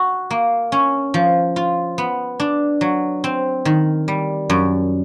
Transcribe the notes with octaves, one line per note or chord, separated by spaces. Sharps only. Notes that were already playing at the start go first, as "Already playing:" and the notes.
Already playing: F#4
A#3
C#4
F3
F4
B3
D4
F#3
C4
D#3
G3
F#2